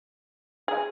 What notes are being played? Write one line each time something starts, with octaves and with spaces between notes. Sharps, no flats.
G#4